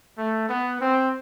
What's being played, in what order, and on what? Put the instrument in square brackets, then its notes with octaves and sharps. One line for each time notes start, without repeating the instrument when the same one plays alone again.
[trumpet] A3
B3
C4